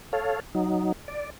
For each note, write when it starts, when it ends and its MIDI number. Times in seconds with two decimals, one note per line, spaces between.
0.13 0.40 69
0.13 0.40 73
0.13 0.40 77
0.55 0.92 54
0.55 0.92 63
1.08 1.30 74